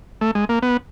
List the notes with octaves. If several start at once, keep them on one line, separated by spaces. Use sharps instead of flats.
A3
G#3
A#3
B3